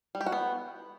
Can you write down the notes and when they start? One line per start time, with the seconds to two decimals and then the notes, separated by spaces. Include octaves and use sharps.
0.15 G3
0.21 G4
0.26 F#4
0.32 B3